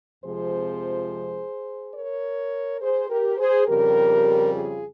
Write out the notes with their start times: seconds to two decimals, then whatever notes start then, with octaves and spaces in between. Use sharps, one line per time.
0.23 F2 C3 F3 G#3 G#4 C5
1.95 A#4 C#5
2.81 G#4 C5
3.10 G4 A#4
3.38 G#4 C5
3.67 F2 C#3 G3 G4 A#4
4.52 F4 G#4